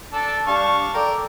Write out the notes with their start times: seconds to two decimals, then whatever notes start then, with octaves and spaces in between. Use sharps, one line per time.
0.12 D4 A4 A5
0.47 G3 D4 F5 A5 C#6
0.94 A4 A#4 D5 G5